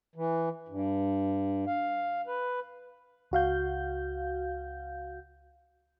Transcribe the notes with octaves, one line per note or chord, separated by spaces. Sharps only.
E3
G2
F5
B4
C#2 F#4 F5 G6